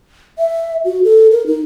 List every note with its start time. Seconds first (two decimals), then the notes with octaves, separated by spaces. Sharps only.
0.39 E5
0.85 F#4
1.04 A4
1.31 A#4
1.46 D#4